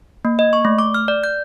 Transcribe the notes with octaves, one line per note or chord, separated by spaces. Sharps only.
A#3
D#5
C#6
A3
D6
F6
D5
G6